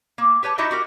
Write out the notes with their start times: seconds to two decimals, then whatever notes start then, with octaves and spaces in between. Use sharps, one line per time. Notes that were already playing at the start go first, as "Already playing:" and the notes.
0.18 A#3
0.43 G4 B4 C#5 A5
0.58 D#4 E4 F#4 G4 D#5 E5
0.71 F#4 G4 A#4